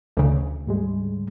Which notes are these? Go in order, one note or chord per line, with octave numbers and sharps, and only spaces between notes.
D2 C#3
G#2 G3 G#3